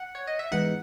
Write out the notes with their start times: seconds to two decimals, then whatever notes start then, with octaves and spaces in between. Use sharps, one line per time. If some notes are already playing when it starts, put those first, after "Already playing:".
Already playing: F#5
0.15 C#5
0.27 D#5
0.39 E5
0.52 G#2 E3 G#3 B3 D#4 F#5